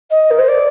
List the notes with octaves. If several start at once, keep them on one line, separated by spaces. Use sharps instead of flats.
D#5
A#4
C5
D5